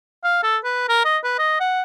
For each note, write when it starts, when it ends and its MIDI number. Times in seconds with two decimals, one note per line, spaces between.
0.24 0.39 77
0.43 0.58 69
0.64 0.86 71
0.89 1.00 70
1.05 1.17 75
1.24 1.39 71
1.39 1.58 75
1.60 1.83 78